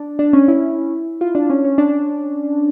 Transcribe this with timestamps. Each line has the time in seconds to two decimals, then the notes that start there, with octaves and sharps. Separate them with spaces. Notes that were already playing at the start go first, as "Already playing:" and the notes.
Already playing: D4
0.19 D4
0.33 C#4
0.48 E4
1.21 F4
1.35 D4
1.50 C#4
1.65 C#4
1.78 D4